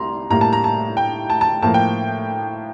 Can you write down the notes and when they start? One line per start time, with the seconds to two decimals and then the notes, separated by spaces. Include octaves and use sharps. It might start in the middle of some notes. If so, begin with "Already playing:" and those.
Already playing: C2 C3 A#5 C6
0.30 A2 G3 A#3 A#5
0.41 A5
0.53 A#5
0.64 A5
0.97 G5
1.30 A5
1.41 A5
1.62 A2 F3 A#3 A5
1.74 G5